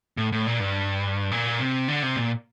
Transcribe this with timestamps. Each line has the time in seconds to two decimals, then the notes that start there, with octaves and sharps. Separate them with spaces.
0.17 A2
0.32 A2
0.47 A#2
0.60 G2
1.31 A#2
1.60 C3
1.88 D3
2.02 C3
2.16 A#2